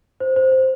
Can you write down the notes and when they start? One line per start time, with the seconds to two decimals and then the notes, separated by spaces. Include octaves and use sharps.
0.20 C5
0.36 C5
0.52 C5